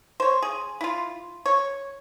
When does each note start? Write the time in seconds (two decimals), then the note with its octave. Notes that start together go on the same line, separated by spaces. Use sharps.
0.20 C5 C#5
0.42 G#4
0.81 E4 F4
1.46 C#5